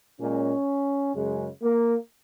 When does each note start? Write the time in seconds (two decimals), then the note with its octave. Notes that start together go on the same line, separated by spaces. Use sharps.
0.19 A#2 G#3 C#4
1.14 F#2 C#3 G#3
1.62 A#3